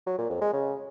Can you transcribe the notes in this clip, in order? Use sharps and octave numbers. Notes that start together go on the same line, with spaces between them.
F#3
A#2
F2
G#3
C#3